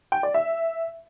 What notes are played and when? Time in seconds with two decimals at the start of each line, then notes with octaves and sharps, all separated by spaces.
0.12 G5
0.23 D5
0.34 E5